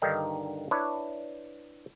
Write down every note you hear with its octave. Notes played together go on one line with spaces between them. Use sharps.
G2 D3 D#3 D#4 F5 G5
D4 E4 B4 C#5